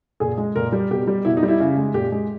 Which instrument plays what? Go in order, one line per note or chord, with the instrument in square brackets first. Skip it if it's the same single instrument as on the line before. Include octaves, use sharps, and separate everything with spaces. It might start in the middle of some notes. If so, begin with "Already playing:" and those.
[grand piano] A#2 G#4
G#3
A#2 A#4
G3
B2 G4
G3
B2 E4
D#4
G3
E4
C#3
G#3
A#2 G4
G#3